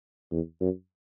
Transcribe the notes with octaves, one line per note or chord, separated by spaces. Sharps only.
E2
F#2